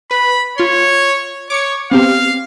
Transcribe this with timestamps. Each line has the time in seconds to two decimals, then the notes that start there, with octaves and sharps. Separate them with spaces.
0.11 B4 B5
0.58 F4 C#5 C6
1.50 C#5 D6 C#7
1.91 B3 C4 G4 F5